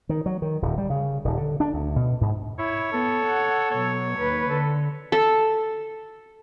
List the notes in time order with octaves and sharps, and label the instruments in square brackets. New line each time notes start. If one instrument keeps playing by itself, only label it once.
[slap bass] D#3
F#3
D#3
D1
G3
C#3
D#1
D3
D4
D2
B2
G#2
[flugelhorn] E4 [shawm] C#5
[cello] B3 [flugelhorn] A4
[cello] F#5
[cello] B2 F#3 [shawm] C#5
[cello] D#2 B4
[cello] D3 [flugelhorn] A4
[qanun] A4